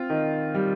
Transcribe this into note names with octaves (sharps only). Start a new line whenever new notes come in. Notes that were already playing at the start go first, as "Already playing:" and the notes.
Already playing: C4 F4
D#3
G3